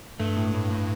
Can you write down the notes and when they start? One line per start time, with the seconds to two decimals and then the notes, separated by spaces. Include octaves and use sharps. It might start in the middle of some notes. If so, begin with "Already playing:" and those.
0.20 G2 A3
0.37 A2
0.54 A2
0.70 A2